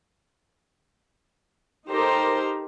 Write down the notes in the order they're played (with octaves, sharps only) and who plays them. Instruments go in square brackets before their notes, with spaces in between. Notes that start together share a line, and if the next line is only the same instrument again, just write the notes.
[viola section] D#4 G4 A4 A#4 C5 A#5